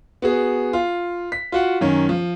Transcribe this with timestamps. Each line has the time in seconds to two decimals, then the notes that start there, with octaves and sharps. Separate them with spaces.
0.22 B3 F#4 G#4
0.73 F4
1.32 B6
1.52 F4 F#4 F#5
1.81 F#2 D#3 C#4
2.09 F3